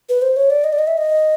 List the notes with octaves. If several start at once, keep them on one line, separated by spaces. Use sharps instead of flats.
B4
C5
C#5
D5
D#5
D5
D#5
E5
D#5